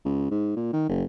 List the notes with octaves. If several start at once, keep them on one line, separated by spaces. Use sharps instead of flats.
C#2
G#2
A#2
D#3
F#1